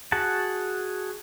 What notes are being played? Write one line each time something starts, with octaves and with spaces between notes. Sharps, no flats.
F#4 G#4 F#5 A5